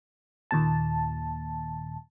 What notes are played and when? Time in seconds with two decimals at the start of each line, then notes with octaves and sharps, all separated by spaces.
0.51 D#2 A#2 A5